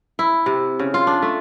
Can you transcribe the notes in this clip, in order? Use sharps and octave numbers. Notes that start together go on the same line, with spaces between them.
E4
C3
C#3
F4
D4
A3